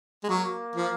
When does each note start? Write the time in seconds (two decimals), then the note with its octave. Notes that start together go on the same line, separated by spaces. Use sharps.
0.24 G#3
0.29 F#3 A#3
0.76 F3